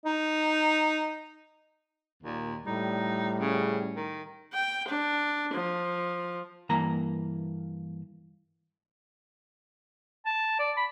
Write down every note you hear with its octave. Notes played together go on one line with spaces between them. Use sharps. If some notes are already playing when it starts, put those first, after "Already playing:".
D#4
D#2 A#2
A2 G3 D#4
C#3
D#3
G5
D4
F3
G2 E3 A#3 A#5
A5
D5
B5